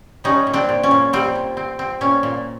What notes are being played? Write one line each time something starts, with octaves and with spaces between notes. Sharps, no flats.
G3 C#4 D#4
A#2
C4 D4
A#2
C#4
A#2
G3 C4
A#2
C4
C4
A#2 C#4
A#2